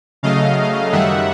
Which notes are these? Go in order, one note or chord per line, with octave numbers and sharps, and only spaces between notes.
C#3 F#3 A3 D#5 F5
F#2 D#3 G3 E5 F#5